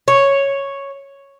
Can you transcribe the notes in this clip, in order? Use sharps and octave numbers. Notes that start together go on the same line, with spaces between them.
C#5